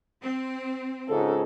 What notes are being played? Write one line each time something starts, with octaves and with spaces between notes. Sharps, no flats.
C4
C#2 G#2 C#3 A4